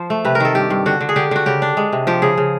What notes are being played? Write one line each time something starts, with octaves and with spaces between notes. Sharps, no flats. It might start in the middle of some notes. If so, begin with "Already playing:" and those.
Already playing: F3 C5
A3
C3 B4
A#4
D#3 A4
G2 G4
G2
D3 F#4
D3
G#4
D3 G4
D3 F#4
C#3 G4
D4
G#3
C3
F3 G4
C#3 G#4
C#3